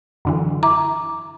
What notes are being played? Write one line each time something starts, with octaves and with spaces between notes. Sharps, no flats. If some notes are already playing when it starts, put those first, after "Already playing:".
F#2 D3 E3
E4 A#5 D6